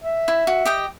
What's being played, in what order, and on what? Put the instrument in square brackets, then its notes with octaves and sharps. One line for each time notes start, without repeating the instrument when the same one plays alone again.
[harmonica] E5
[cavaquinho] E4
F#4
G4 D#5 G5